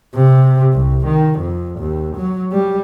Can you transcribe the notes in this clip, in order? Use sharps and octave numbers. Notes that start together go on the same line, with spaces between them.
C3
C2
D#3
F2
D#2
F#3
G3